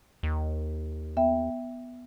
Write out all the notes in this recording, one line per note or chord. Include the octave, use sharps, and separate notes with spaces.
D#2
B3 E5 G5